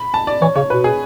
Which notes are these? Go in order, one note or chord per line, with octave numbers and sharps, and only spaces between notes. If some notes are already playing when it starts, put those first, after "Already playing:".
Already playing: B5
A5
D5
E3 C#5
C#3 C#5
B2 B4
G#4